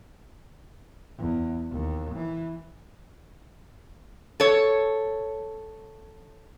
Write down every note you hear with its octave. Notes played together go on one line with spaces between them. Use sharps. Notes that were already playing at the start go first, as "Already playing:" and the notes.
E2
D#2
E3
A4 C#5